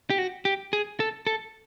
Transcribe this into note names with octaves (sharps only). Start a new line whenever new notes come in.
G4
F#4
G4
G#4
A4
A4